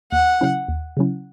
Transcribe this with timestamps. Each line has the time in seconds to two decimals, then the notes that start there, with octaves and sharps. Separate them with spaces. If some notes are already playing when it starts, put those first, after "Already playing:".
0.12 D#2 F#5
0.41 C#3 F#3 C#4 E4
0.68 D#2
0.97 C#3 F#3 C#4 E4